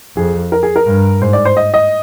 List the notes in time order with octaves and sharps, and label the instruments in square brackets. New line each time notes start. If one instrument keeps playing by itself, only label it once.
[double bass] F2 [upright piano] G#4
[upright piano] A#4
G#4
A#4
[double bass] G2
[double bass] G#2 [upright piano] C5
[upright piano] D5
C5
D#5
D#5